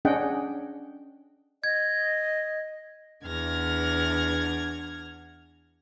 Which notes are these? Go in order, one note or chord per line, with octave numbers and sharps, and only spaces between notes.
C#4 D4 G#4 D#5 F#5 G5
D#5 G#6
E2 D4 F#5 F6 G#6 A#6